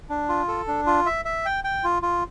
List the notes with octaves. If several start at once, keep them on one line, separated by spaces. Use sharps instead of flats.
D4
F4
A4
D4
F4
E5
E5
G5
G5
F4
F4